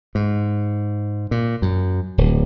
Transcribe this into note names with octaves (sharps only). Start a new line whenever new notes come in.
G#2
A#2
F#2
D1